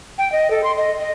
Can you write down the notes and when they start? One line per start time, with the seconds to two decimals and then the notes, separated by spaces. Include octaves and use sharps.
0.18 G5
0.32 D#5
0.51 A4
0.64 C6
0.77 D#5
1.00 D#5